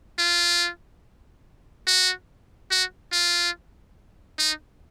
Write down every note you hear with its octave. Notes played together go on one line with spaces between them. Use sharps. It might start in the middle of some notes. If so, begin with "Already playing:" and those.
F4
F#4
F#4
F4
D#4